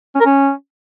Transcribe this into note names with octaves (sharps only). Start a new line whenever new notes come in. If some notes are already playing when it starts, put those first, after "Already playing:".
C#4
A#4
C#4